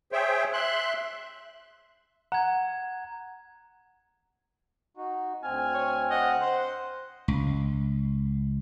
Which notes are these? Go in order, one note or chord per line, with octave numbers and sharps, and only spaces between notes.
G#4 C5 C#5 E5 G5
E5 C6 F#6
F#5 A#5 G#6
D#4 F#4
D2 C4 G#5 F6
C#5
D#5 F#5
C5
C#2